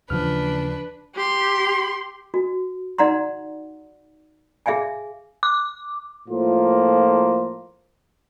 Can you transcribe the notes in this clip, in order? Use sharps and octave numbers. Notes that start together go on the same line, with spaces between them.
D#2 C#3 E3 F3 D4 B4 F6
G4 C6
F#4
D#4 D5 F#5 A#5 C6
G#4 E5 F5 G5 G#5
D6
A2 F3 A#3 F4